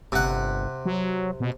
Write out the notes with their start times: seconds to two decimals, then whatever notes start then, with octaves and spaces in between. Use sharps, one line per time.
0.12 G1 C3 F#5
0.86 F#3
1.40 B2